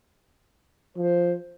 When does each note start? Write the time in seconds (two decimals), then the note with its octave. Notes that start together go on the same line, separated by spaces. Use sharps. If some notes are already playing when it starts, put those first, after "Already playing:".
0.97 F3 C5